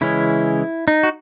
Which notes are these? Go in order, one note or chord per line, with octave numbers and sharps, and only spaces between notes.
C#3 E3 G#3 C#4 E4
D#4
F#4